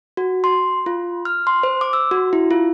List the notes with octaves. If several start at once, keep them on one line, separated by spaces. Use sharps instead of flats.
F#4
C6
F4
F6
C6
C5
D6
E6
F#4
E4
F4